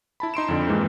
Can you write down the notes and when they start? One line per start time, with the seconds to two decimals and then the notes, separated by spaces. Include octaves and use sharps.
0.20 E4 A5 B5
0.34 D#4 C6 D7 E7
0.48 F2 D3
0.67 F2 G#2 E3 G#3 A#3 D#4